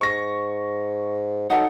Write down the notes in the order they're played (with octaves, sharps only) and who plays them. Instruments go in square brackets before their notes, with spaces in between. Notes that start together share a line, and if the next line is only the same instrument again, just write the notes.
[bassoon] G#2 [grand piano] C#6 A#6
[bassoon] F#3 [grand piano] D#4 A4 [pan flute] F#5